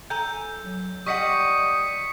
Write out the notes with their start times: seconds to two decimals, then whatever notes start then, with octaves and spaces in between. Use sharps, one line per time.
0.10 A4 G#5 A#5 G6
0.62 F#3
1.07 G3 D#5 F#5 C#6 D#6 B6 C#7